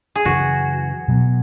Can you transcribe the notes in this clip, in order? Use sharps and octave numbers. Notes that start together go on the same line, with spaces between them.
G#4
F#2 C#3 E3 F#4
B2 F#3 B3